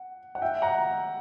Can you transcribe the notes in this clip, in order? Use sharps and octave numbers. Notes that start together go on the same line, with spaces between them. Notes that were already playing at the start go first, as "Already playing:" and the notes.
Already playing: F#5
F#5
E5 G5
F#5 A#5